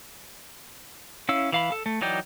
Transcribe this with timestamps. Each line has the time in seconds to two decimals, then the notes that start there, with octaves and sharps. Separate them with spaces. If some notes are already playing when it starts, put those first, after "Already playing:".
1.29 C#4 E4 F5 E6
1.52 E3 F5 B5
1.72 A4
1.86 A3
2.01 E3 F#3 D#4 D5 G5